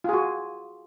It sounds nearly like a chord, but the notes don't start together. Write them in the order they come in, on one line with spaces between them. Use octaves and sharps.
F4 G#4 F#4